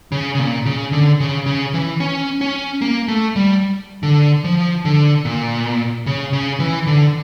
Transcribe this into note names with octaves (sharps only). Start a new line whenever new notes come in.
C#3
C#3
A#2
C#3
D3
C#3
C#3
E3
C#4
C#4
A#3
A3
G3
D3
F3
D3
A#2
C#3
C#3
E3
D3